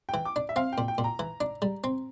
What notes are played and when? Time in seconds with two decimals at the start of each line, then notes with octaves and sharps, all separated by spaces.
0.09 G5
0.14 E3
0.25 D6
0.36 D4
0.49 E5
0.56 C4 F5
0.73 G5
0.78 A#2
0.88 G5
0.98 A#2
1.04 A#5
1.19 E3
1.41 D4
1.62 G3
1.84 C4